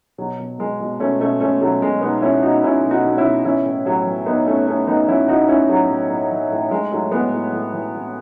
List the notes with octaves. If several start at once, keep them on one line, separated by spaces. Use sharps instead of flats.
B2 F#3
B2
B2 G#3
B2
B2 A3 C#4
B2 A3 C#4
B2 A3 C#4
B2 F#3 A3
B2 G#3
B2 B3 D#4
B2 C#4 E4
B2 D#4 F#4
B2 C#4 E4
B2
D#4 F#4
B2
C#4 E4
B2
E3 C#4 E4
A2
A2 F#3
E3
A2 B3 D#4
A2 A3 C#4
A2 A3 C#4
E3 B3 D#4
E3 C#4 E4
A2 D#4 F#4
A2 C#4 E4
A2 F#3
A2
A2
E3
A2
A2 G#3
A2 F#3 A3
A2 G#3 B3
A2
A2
E3
A2